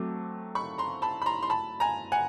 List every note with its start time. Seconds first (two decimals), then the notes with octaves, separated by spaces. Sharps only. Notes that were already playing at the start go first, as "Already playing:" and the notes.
Already playing: F#3 A3 C4 D6
0.55 B5 C#6
0.78 A#5 C6
1.02 A5 B5
1.22 B5
1.26 A#5 C6
1.43 C6
1.50 A5 B5
1.80 G#5 A#5
2.12 F#5 G#5